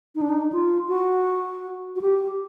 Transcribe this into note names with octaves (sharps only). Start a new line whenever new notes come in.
D#4
D4
D#4
F4
F#4
F#4
G4